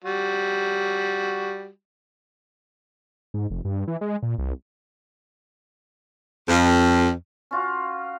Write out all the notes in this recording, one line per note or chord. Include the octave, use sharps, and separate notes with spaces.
G3 F#4
G#2
F1
G2
E3
G#3
A#2
C2
F2
C#4 F4 F#4